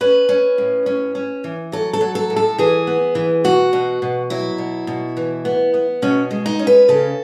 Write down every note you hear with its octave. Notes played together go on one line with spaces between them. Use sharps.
C#4 B4
C#4
A2
C#4
C#4
E3
F#3 A4
A4
F#3
A4
A2
A4
E3 G#4
B3
E3
B2 F#4
B2
B2
F#3 E4
B2
B2
E3
B3
B3
B2 C#4
G#3
D#4
C#4
B4
C#3 A4